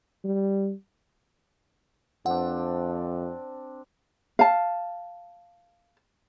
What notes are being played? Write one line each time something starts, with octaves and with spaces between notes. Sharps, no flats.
G3
F2 C4 D4 F#5
F5 A5